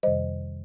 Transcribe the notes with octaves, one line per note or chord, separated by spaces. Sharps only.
F2 C3 D#3 G3 C5 D#5